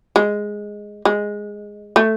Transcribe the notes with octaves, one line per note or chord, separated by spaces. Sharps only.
G#3
G#3
A3